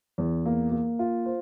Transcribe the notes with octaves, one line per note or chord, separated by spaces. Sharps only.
E2
A#3
A#3
F4
C5